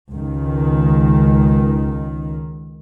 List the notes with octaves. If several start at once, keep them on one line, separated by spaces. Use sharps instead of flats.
C#2 D#3